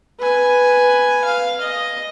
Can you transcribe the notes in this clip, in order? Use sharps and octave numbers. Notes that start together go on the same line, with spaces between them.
B4 G#5
F5
D#5